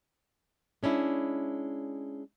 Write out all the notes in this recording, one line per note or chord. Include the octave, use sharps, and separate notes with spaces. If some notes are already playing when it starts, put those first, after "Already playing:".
G#3 C#4 D4 E4